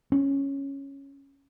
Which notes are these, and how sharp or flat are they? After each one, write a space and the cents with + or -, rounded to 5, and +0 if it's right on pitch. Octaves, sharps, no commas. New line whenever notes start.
C#4 -5